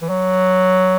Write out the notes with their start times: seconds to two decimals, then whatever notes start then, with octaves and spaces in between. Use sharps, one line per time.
0.02 E3
0.09 F#3